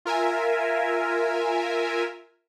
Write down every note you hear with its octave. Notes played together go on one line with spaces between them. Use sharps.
F4 A#4 E5 G#5